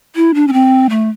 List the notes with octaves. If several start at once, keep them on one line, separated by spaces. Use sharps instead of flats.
E4
D4
C#4
C4
A3